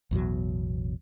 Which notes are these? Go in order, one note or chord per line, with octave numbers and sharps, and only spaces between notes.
A1 E2 B2 F#3